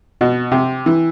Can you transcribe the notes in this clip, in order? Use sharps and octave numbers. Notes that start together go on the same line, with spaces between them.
B2
C3
E3